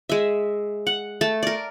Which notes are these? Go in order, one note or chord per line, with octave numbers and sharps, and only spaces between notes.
G#3 E5
F#5
A3 A5
A#4 D5